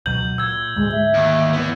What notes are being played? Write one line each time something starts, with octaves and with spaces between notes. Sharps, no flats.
C#2 B2 F#3 G6 F#7
A#2 E6 G#6
D2 G#2 G#3
E5
D#2
E3 B3